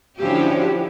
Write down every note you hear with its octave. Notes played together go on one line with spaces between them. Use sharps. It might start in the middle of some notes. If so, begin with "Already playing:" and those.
D3 F3 C#4 E4 F#4 G4